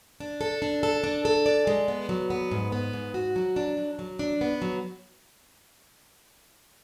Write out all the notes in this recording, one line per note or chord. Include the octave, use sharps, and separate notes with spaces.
D4
A4
D4
A4
D4
A4
D5
G#3
B3
F#3
B3
G#2
B3
G#2
F#4
F#3
D4
F#3
F#3
D4
B3
F#3